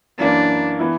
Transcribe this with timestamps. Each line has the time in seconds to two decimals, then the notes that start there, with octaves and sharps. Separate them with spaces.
0.19 F#2 E3 A#3 D4
0.79 E3 B3 E4